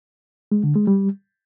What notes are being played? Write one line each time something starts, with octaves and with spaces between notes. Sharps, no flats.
G#3
D3
G#3
G3